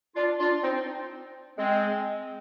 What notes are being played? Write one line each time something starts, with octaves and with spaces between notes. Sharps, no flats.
D4 F4
D4 F4
C4 D#4
G#3 C4